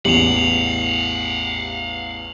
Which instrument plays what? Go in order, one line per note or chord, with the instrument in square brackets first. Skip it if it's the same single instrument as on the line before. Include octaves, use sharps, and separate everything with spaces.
[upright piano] A1 E2 [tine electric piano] G4 [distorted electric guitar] F5 F#5 [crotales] F7 F#7